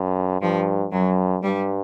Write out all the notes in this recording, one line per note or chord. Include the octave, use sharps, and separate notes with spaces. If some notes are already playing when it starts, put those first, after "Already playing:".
Already playing: F#2
G2 F3
F#2 F#3
G2 G3